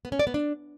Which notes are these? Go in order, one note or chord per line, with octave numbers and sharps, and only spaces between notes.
B3
C#4
D5
B3
D4